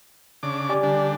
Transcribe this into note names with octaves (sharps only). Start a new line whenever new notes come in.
C#3 D4 D6
G4 D5 G#5
D3 G3 D4